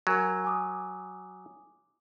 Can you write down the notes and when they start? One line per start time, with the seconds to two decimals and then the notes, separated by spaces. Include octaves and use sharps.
0.07 F#3 A#4 G#5 G#6
0.44 G#5 D6 D#6